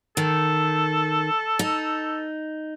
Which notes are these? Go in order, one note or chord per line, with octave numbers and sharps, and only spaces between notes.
D#3 A4
D#4